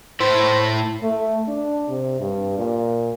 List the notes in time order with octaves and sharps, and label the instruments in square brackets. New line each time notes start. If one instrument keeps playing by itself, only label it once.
[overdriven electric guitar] A2 E4 [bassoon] C5
[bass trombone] A3
D4
C3
G2
A#2